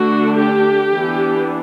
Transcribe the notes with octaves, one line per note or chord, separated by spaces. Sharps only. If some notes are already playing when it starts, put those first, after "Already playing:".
Already playing: D3 A3 D4 F#4
G4
E3 B3 D4